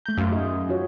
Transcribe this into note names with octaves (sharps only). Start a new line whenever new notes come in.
A3 A#5 G6
F#2 E5 F5 C6
D#4 G#4 D#5
F4 F#4 C#5